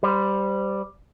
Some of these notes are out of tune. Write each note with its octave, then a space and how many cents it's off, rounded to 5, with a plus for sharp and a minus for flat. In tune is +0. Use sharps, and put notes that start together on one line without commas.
G3 +0 C5 -20